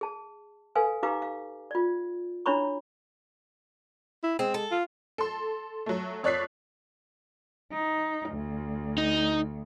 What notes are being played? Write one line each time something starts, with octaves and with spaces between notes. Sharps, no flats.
G#4 A5
A4 B4 F5 G#5
D#4 G4 B4 F5 A#5 D6
F5
F4 D5
D4 E4 C#5 A#5 B5 C#6
E4
G#3 C4
A4
F4
A4 C6
F#3 A3
F2 C#5 D5 F#6 B6 C7
D#4
D2
D#4